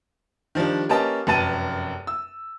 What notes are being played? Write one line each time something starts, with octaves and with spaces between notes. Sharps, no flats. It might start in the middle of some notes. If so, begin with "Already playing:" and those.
D#3 F3 G3 D4
A#3 C#4 G4 B4 D#5 A5
F1 F#2 B4 A5 A6 D#7
E6